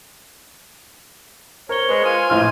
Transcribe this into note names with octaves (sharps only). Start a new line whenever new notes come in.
A#4 C5 C#5 C#6 G7
G#3 B4
F4 G#5
A#1 A2 F4 F6